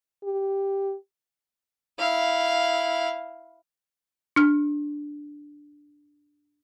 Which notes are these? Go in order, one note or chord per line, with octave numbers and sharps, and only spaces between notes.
G4
E4 F5
D4 F6